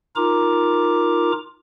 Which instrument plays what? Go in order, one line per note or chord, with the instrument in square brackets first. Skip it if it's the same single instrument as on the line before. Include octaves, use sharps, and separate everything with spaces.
[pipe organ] D#4 F4 A#4 A#5 D6